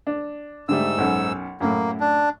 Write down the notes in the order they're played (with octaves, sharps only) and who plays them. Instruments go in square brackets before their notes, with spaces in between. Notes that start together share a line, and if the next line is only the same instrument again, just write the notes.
[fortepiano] D4
[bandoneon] G#2 E6 [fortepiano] D3 G3 A3
[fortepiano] B1 F#2
[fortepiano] F#2 A2 [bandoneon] A#3
[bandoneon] D4